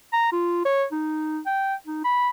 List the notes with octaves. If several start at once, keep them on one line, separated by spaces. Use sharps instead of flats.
A#5
F4
C#5
D#4
G5
D#4
B5